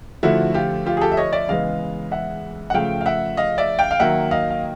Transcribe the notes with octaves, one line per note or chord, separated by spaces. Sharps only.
D3 F3 A3 E4 F#4
F4 G4
F4 G4
G#4
G4 A4
E5
C#5 D#5
D5 E5
C#3 E3 G#3 B3 D#5 F5
E5 F#5
F#5
C#3 F3 A3 F5 G5
F5
E5 F#5
D#5 F5
D5 E5
F5 G5
F5
D#3 F#3 A#3 E5 F#5
D#5 F5
F5